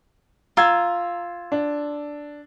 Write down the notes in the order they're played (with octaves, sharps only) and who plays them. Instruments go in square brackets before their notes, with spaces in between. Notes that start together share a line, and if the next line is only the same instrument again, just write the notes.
[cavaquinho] F4 [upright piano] A#5 E6 G#6
[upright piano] D4